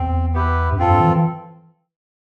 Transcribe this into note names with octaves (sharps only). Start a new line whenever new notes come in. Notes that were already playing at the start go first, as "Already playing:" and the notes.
Already playing: E2 C4
B3 E4 G4 B4
G2
F2 C4 F4 A4
G2
E3
E3